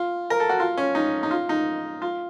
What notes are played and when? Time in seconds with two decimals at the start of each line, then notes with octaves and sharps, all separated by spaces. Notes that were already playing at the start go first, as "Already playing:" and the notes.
Already playing: F4
0.30 A#4
0.40 A4
0.49 F#4
0.60 F4
0.78 C#4
0.95 D#4
1.23 D#4
1.31 F4
1.49 D#4
2.02 F4